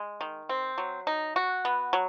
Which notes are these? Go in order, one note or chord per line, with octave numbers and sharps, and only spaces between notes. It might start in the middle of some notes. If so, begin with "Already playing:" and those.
Already playing: G#3
D#3
C4
F#3
D#4
F#4
B3
F#3